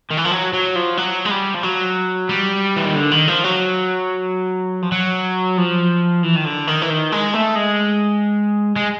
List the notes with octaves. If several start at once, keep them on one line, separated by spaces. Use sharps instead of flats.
D#3
E3
F3
F#3
F#3
F3
F#3
G#3
G3
F3
F#3
G3
E3
D#3
D3
D#3
F3
F#3
F3
F#3
F3
E3
D#3
D3
D#3
E3
D#3
G#3
A3
G#3
G#3